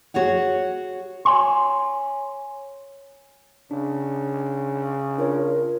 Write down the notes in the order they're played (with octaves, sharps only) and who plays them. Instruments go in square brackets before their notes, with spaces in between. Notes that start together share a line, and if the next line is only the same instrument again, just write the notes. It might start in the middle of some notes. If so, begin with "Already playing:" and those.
[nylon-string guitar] F#4 G#4 C#5 F#5
[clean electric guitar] C#5 G#5 C6
[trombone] C#3 [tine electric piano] D4
[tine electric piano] D4 F4 C#5 [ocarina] A#4